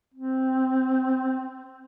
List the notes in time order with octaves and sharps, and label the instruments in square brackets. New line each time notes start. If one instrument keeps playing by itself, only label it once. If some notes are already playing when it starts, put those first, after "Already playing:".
[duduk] C4